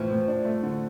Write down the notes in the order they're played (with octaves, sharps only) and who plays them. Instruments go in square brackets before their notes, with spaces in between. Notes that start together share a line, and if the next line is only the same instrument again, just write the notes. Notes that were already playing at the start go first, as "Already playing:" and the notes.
Already playing: [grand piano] A2 E3 A3 [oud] F3
[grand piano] A2
D4
A3
D3